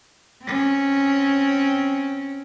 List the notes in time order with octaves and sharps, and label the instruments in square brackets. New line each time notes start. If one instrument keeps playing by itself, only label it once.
[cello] C4 C#4